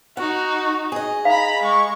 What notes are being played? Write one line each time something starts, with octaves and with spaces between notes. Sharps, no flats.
D#4 F#4 F#5
G#4 D#5
F5 A#5 B5
G#3 C#6